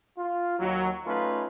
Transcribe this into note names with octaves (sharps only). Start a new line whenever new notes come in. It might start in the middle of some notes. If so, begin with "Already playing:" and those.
F4
D#2 F#3
A3 C#4 D#4 F4 B4